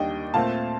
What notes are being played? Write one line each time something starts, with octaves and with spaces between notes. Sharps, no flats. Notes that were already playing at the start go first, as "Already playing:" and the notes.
Already playing: D#2 D#3 G3 D4 D#5 G5
A#2 A3 C4 F5 A5